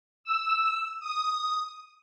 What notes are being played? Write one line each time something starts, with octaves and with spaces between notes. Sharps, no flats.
E6
D#6